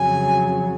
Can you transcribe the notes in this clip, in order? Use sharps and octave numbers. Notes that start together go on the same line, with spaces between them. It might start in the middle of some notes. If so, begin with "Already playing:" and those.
Already playing: F2 C#3 F#3 G#5